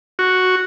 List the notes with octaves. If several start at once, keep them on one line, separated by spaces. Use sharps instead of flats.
F#4